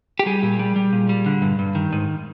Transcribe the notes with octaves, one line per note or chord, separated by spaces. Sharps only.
G4
G3 G#4
A#2
G3
G3
A#2
G3
D3
G2
G2
D#3
G#2